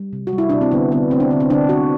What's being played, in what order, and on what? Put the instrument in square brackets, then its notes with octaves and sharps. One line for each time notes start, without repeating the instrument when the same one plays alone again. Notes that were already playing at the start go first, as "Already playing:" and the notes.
Already playing: [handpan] G3
C3
F#4
G3
E4
C3 D4
C4
D3 B3
D3 B3
A3 C4
D4
D3 C4
C4
D3 D4
D3 F#4